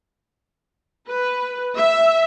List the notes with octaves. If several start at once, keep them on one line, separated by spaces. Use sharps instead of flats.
B4
E5